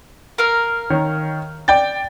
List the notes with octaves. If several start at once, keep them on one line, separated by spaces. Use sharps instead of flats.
A#4 F5
D#3 C#5
D5 G5 A6